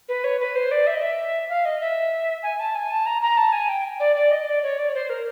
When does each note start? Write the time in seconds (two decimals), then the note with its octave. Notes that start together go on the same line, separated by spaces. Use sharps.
0.09 B4
0.24 C#5
0.40 B4
0.55 C5
0.71 D5
0.87 E5
0.95 D#5
1.02 E5
1.50 F5
1.65 D#5
1.81 E5
2.43 G#5
2.59 A5
2.75 G#5
2.90 A5
3.06 A#5
3.22 A#5
3.37 A5
3.53 G#5
3.69 G5
4.00 D5
4.16 D5
4.31 D#5
4.47 D5
4.63 C#5
4.78 D5
4.89 C#5
4.94 C5
5.10 A#4